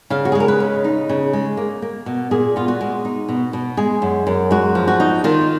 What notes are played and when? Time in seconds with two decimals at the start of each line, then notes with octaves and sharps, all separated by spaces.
0.10 C#3 F5
0.25 F#4
0.32 G#4
0.35 G#3
0.40 A#4
0.48 B4
0.60 C#3
0.84 D#4
1.09 C#3
1.33 G#3
1.57 A#3
1.82 A#3
2.06 B2
2.31 A#2 G#4
2.56 B3 F4
2.68 F#4
2.81 G#3
3.05 D#4
3.29 B2
3.53 B2
3.77 G#3 G#4
4.02 F#2
4.27 F#2
4.51 G#3 F#4
4.75 F3
4.88 F#4
5.00 D#4
5.24 D#3 F4